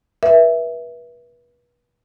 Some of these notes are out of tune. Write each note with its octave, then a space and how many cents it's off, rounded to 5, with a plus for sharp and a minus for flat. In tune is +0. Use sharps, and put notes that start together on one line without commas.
B4 -35 E5 +0